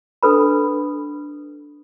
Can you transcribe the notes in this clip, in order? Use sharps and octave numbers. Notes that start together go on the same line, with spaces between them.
D4 A4 B4 B5